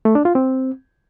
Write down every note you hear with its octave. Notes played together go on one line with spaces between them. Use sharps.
A3
D4
F4
C4